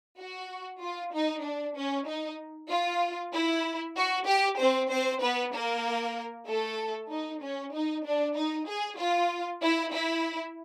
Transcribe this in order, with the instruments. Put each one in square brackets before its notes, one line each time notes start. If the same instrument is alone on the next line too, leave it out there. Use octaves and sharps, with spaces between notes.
[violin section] F#4
F4
D#4
D4
C#4
D#4
F4
E4
F#4
G4
C4 C5
C4 C5
B3 B4
A#3 A#4
A3 A4
D#4
C#4
D#4
D4
D#4
G#4
F4
E4
E4